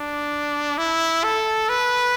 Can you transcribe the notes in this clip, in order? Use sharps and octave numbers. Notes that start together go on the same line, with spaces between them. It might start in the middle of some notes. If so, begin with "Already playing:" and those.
Already playing: D4
E4
A4
B4